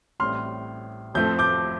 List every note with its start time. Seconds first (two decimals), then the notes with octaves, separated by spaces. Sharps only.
0.20 A1 A2 G3 C4 C6 F6
1.14 F1 F2 F3 A3 C4 G6
1.39 D6 G6